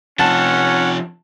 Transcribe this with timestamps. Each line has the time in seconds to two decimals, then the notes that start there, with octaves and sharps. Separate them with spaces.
0.19 C3 F3 C#4 F#5 A5